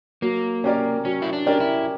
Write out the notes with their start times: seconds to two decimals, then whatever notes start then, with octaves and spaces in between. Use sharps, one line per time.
0.22 F#3 A#3
0.64 C#4 G4 A#4 D5
1.05 F#3 C#4
1.22 E4
1.33 D4
1.46 C#4 G4 A#4 D5
1.60 E4